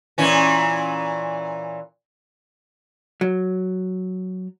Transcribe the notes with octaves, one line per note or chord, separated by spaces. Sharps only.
A#2 E3 C#4
F#3